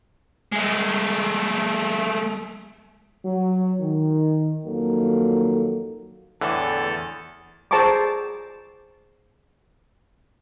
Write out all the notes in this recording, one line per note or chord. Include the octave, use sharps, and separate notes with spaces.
G#3 A3
F#3
D#3
F2 D#3 F#3 A#3 A4
E2 A2 D3 E3 A4
G#4 C5 A5 A#5 C#6 D6